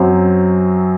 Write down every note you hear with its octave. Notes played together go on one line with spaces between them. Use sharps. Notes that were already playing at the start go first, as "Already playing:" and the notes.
Already playing: F#2 F#3 C4